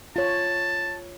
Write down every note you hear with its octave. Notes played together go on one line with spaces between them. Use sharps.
F4 C#5 A5